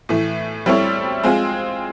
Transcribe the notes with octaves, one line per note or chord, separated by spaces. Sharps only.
A2 E3 A3
G3 C4 E4 A4 C#5
G#3 C4 F4 G#4